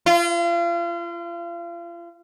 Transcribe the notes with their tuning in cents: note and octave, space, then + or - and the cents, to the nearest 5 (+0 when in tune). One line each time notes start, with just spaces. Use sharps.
F4 -35